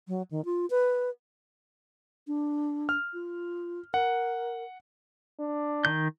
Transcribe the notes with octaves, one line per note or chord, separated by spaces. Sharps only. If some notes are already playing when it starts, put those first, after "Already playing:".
F#3
D#3
F4
B4
D4
F6
F4
A#4 F#5
D4
D#3 G6